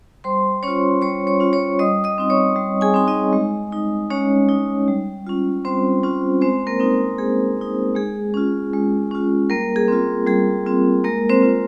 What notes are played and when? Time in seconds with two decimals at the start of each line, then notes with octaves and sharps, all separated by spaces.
0.24 G3 C5 C6
0.63 C#4 F4 C#5 C#6
1.02 G3 C#5 C#6
1.27 C#5 C#6
1.40 C#4 F4
1.53 C#5 C#6
1.79 G3 D#5 D#6
2.04 D#5 D#6
2.18 C4 D#4
2.30 C#5 C#6
2.56 G3
2.81 G#4 G#5
2.94 C4 D#4
3.07 D#4 D#5
3.33 G#3
3.72 D#4
4.11 G#3 C#4 C#5
4.49 D#4
4.88 G3
5.27 C#4 F4
5.65 G3 C4 C5
6.03 C#4 F4
6.42 G#3 C4 C5
6.67 A#3 A#4
6.80 C4 D#4
7.18 G#3 G#4
7.57 C4 D#4
7.95 G#3 G#4
8.34 C#4 F4
8.73 G#3
9.11 C#4 F4
9.50 G3 A#3 A#4
9.76 G#4
9.88 C4 F4
10.27 G3 G#4
10.66 C4 F4
11.04 G#3 A#3 A#4
11.29 C4 C5
11.42 C4 F4